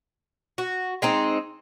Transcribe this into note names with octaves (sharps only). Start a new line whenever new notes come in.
F#4
G#3 C4 D#4